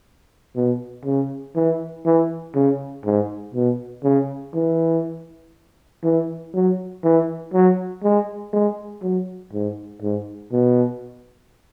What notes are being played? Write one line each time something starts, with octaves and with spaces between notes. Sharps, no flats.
B2
C#3
E3
E3
C#3
G#2
B2
C#3
E3
E3
F#3
E3
F#3
G#3
G#3
F#3
G#2
G#2
B2